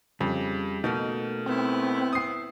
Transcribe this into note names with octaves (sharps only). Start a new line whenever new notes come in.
F2 C#3 G3
B2 A3 A#3 D#4
B3 C4 E4
D#6 C7